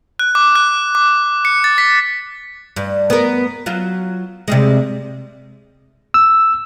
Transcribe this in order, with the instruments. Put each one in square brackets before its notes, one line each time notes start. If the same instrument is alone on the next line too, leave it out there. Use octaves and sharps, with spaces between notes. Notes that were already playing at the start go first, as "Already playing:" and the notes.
[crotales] F#6
D6
F#6
D6
C#7
A6
B6
[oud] G2
B3 A#4
F#3 F4
C3 G3 G#3
[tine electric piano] E6